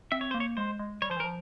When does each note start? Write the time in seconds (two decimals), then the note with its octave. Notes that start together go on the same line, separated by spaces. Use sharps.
0.12 C4 E5
0.21 C#5
0.31 A#3 C5
0.40 C#5
0.57 G#3 C5
0.79 G#3
1.02 G3 C#5
1.10 F3 C5
1.17 E3
1.20 A#4
1.24 F3